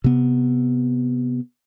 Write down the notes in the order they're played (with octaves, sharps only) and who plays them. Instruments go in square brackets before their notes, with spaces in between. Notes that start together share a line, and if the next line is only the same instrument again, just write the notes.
[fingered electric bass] C3 B3